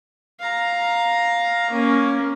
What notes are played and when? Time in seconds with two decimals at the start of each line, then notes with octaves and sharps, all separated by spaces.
0.39 F5 A#5
1.70 A#3 C#4